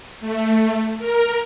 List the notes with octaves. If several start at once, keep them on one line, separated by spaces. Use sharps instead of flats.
A3
A#4